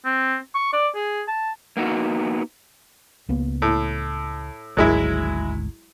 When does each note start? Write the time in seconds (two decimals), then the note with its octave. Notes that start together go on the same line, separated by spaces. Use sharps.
0.05 C4
0.55 C#6
0.73 D5
0.95 G#4
1.28 A5
1.77 A#3 B3 D#4 F#4
3.29 C#2 A#3 B3
3.62 A2
4.77 G#1 D2 G#2 F#3 G#3 E4